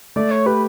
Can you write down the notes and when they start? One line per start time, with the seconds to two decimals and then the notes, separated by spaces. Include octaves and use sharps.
0.16 A3 D5
0.31 C#5
0.46 G4 B4